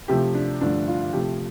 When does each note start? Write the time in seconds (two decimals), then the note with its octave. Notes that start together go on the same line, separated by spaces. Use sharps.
0.08 C3 F3 A3 G4
0.34 D4
0.61 G2 D3 F3 A3 D4
0.88 F4
1.13 C3 F3 A3 G4